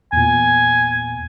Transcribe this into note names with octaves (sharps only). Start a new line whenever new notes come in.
E2 A#2 G#5